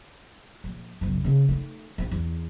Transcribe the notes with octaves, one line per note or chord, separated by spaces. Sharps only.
A#1
F#1 B1
C#3 C4
D#3 A3
A#1 C4
E2